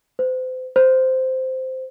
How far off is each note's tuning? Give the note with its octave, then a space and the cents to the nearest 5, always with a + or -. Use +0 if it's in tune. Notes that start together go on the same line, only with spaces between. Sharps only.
C5 -35
C5 -10